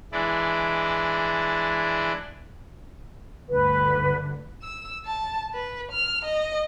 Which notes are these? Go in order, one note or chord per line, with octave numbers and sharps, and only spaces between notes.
E3 G#3 D4 E4 D5
D2 G2 D3 B4
E6
A5
B4
F6
D#5